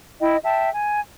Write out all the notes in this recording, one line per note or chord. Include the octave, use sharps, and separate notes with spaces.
E4 D#5 G5
E5 G5 A5
G#5